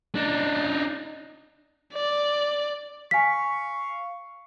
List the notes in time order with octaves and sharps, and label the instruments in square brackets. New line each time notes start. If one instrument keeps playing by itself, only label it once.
[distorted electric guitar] D4 D#4
[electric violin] D5
[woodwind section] F5 C#6 [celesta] G#5 B6